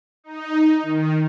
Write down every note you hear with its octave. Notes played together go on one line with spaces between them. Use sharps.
D#4
D#3